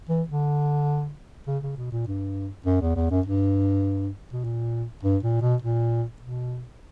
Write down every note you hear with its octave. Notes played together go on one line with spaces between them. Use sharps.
E3
D3
C#3
C#3
B2
A#2
G2
F#2
E2
E2
F#2
G2
B2
A#2
G2
A#2
B2
A#2
B2